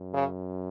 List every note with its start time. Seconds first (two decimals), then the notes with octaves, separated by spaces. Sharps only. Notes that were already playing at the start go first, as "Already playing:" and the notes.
Already playing: F#2
0.14 C#3